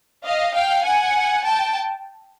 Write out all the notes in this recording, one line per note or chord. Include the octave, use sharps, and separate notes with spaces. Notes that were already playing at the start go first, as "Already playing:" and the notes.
D#5 F5
F5 G5
F#5 G#5
G5 A5